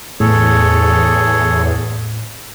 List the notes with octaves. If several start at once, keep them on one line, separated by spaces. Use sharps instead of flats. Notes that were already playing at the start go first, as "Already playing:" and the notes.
E2 A2 G#4 A4 C#5